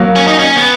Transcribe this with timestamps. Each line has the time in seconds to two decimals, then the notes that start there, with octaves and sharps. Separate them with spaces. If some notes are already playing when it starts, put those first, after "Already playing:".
Already playing: F#3 A#3
0.16 C#4
0.27 D#4
0.39 C#4
0.56 B3